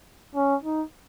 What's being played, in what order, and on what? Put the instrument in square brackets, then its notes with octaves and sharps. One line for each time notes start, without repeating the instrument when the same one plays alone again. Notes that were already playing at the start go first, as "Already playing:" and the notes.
[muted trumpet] C#4
D#4